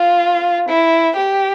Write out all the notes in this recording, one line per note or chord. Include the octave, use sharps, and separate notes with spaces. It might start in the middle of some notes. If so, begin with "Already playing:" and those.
Already playing: F4
E4
G4